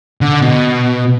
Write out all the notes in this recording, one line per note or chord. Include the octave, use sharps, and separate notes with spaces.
D3
B2